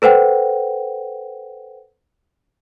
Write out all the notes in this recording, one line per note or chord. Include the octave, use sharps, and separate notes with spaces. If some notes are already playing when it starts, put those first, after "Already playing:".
A4 B4 C5 F#5 G5